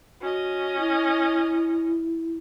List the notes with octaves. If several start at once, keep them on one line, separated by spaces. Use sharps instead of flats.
C#4 F#4 D#5
E4